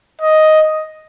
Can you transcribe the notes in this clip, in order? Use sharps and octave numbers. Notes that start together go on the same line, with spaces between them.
D#5